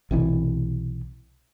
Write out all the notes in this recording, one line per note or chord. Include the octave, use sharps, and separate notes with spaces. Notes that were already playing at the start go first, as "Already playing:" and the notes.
B1 C3 E3